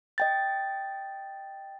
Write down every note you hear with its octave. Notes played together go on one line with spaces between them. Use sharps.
D#5 G5 A6